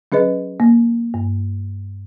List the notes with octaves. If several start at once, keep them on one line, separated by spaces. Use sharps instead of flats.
F#3 C#4 G#4 B4 D#5
A#3
G2